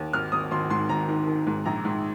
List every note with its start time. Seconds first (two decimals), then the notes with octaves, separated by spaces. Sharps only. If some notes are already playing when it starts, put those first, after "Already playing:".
Already playing: D#2
0.13 G#1 F6
0.32 G#1 D#6
0.51 G#1 C6
0.70 G#2 C6
0.89 G#1 A#5
1.08 D#3
1.27 D#3
1.47 G#2
1.65 A#1 A#5
1.85 G#2